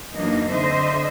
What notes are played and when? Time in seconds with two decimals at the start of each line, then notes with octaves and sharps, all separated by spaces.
0.14 F#2 E3 F#3 A#3 D4 D#4
0.50 D3 C4 C5 D#5 E5